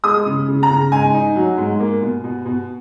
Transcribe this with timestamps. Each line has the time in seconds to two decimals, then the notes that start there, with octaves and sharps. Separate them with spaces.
0.04 G#3 D#6
0.26 C#3
0.48 C#3
0.63 A#5
0.70 C#3
0.92 G#2 G#5
1.14 D#4
1.36 F#3
1.58 G#2
1.80 A#3
2.02 B2
2.24 B2
2.45 B2